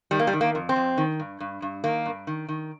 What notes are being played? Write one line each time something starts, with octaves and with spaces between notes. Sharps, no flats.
D#3 G3
A#3
G3
D#3
A#3
F2
C4
F2
D#3
G2
G2
G2
D#3 A#3
G2
D#3
D#3